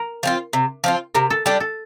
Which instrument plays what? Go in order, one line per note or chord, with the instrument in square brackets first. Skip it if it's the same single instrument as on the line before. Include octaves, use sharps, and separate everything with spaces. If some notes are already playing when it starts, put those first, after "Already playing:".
Already playing: [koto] A#4
[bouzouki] F3 C4 F4
C3
F3 C4 F4
[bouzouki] C3 [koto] A#4
[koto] A4
[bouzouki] G3 D4 G4 [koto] A4
[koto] A4